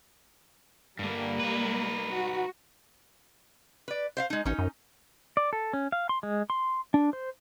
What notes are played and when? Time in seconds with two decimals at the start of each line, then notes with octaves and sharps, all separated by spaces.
0.99 G2 D3 G3 A#3
1.40 D#4 B4
2.12 F#4
3.88 B4 D5
4.17 C5 E5 F5
4.30 G#3 D#4
4.46 A1 C#4 D#4
4.59 F#2
5.37 D5
5.53 A4
5.73 C#4
5.92 F5
6.09 C6
6.23 G#3
6.50 C6
6.94 D4
7.13 C5